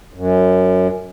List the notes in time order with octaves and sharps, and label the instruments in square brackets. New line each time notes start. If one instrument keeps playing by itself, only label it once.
[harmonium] F#2